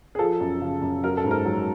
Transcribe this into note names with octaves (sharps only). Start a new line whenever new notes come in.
G#4
F3 A4
F#2
C#3
F#2
F#3 A#4
A4
G#2
A#4
F#3